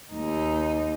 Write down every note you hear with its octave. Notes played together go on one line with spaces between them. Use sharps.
D#2 D#4